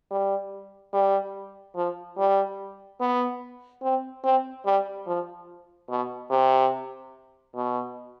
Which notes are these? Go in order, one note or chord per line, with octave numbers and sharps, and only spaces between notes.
G3
G3
F3
G3
B3
C4
C4
G3
F3
B2
C3
B2